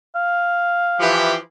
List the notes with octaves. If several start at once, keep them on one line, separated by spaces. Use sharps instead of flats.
F5
E3 F3 G4